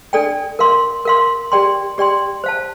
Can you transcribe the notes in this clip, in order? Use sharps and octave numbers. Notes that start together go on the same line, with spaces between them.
D4 A4 D5 G5
A#4 F5 C6
A#4 F5 C6
G4 D5 G5 C6
G4 D5 G5 C6
C5 F5 A5